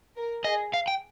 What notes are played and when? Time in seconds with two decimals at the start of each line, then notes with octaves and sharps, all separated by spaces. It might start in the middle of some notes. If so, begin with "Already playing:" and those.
0.16 A#4
0.44 G#4 D#5
0.74 F5
0.88 G5